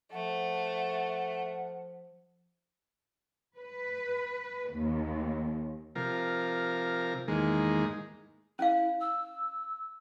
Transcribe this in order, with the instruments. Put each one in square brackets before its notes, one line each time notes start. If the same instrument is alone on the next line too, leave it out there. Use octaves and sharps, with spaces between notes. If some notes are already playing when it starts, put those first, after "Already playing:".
[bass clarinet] F3 [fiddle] A3 [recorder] F#5
[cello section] B4
D#2
[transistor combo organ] C3 F3 A#4
E2 G#2 D#3 G#3 A#3
[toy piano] C#4 F5 [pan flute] E4
[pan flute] E6